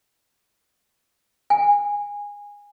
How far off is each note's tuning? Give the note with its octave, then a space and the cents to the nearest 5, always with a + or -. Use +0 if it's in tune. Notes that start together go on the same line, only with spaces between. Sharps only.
G#5 -20